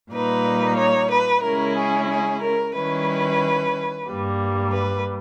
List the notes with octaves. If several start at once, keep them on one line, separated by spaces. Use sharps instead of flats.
A#2 G3 A#3 D#4 B4
C#5
B4
C#3 G#3 C#4 E4 A#4
G#4
G#4
A#4
D#3 G3 C#4 E4 B4
G2 G3 A#3
B4